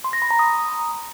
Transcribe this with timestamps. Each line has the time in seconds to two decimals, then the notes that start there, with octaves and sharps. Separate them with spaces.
0.04 C6
0.13 A#6
0.22 B5
0.31 A#5
0.39 D#6